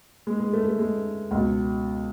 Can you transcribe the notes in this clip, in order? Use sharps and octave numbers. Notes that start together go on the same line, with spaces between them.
G#3
G#3
A3
A3
G#3
C#2 B2